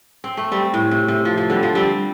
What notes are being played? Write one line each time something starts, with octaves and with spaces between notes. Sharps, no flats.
C4
A3
G3 C4
A2
C3
C3
F3
F3
D3 G3
F3
G3 C4